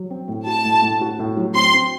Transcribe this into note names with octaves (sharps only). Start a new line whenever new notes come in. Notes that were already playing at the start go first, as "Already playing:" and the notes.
Already playing: F#3
C4
A2
F#4 A5
A2
A2
F#4
A2
F#3
C4 C6
C4